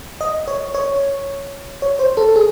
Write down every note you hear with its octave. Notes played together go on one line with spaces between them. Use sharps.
D#5
C#5
C#5
C#5
C5
A4
G#4